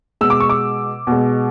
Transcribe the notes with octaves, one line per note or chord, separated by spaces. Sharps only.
B2 G#3 E6
D6
C#6
D6
B2
G#3